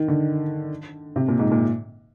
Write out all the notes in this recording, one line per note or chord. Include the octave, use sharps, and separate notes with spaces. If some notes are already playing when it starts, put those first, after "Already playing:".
Already playing: D#3
D3
C3
A#2
G#2
A#2